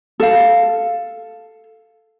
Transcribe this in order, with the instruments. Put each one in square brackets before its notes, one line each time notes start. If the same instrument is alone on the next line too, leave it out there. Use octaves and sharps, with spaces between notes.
[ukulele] A4 F5